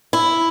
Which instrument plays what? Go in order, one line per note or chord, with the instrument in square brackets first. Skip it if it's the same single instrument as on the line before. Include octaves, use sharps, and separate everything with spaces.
[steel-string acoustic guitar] E4